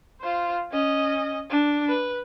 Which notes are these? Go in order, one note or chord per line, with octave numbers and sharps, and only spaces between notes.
F4 C5
C#4 D#5
D4
B4